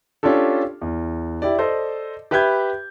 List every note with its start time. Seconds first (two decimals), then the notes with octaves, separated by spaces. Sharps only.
0.23 C#4 D4 F4 G4 A4
0.81 E2
1.42 E4 G4 D5
1.58 A4 C5 D5 D#5
2.31 G4 B4 E5 B5 G6 G#6